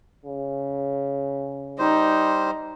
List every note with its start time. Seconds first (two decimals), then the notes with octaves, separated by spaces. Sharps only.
0.25 C#3
1.79 G3 D#4 C5